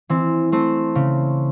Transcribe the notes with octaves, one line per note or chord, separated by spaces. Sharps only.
E3 C4
A3 C4
C#3